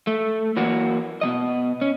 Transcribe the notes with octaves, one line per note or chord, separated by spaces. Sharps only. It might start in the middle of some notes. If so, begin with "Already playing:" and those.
A3
E3 F#3 A#3 F#4
B2 F3 D#5
C#4